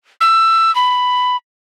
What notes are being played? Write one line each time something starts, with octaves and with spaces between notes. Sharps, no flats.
E6
B5